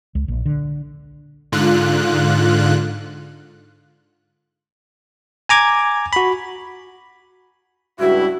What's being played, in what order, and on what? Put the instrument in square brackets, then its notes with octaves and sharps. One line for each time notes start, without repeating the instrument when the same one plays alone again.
[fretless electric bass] C#2
A#1
D3
[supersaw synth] G#2 D3 F4 F#6
[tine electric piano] G#5 A#5 D6 G#6
F#4 B5
[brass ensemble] C#2 G2 E4 [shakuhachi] F#4